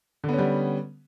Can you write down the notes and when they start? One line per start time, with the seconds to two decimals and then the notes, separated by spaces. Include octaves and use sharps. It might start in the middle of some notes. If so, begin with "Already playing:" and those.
0.24 D3
0.29 B3
0.34 C#4
0.38 G3